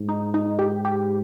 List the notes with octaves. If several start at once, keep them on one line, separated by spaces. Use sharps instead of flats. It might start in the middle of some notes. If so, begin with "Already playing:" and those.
Already playing: G#2
D#4
D#4
G4
G4